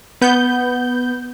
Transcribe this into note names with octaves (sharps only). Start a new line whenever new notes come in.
B3 G6